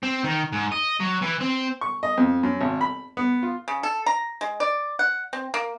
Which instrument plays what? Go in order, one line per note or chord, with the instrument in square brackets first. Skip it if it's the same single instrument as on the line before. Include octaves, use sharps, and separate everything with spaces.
[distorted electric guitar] C4
D#3
G#2
D#5
F#3
E3
C4
[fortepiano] C#6
D#5
F2
F#2
G#1
B5
B3
F4
[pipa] C#3
A4
A#5
G#3
D5
F#5
C4
A#3